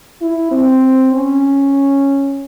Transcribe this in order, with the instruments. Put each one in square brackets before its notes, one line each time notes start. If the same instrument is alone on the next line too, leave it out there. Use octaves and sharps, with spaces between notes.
[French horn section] E4
C4
C#4